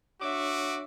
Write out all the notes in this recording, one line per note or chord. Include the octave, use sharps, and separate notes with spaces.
D4 F#4 C#5 E5 D6